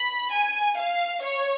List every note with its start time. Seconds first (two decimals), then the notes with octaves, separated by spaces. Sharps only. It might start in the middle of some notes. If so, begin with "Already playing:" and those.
Already playing: B5
0.33 G#5
0.78 F5
1.23 C#5